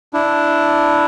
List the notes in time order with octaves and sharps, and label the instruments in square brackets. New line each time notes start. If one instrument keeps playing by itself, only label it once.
[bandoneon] D4 E4